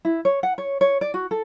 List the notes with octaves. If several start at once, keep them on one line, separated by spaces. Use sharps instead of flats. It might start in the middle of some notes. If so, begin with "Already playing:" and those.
E4
C#5
F#5
C#5
C#5
D5
F#4
A4